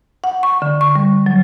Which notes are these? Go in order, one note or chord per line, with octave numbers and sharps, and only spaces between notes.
F#5
C#6
D3
C#6
G3
F#3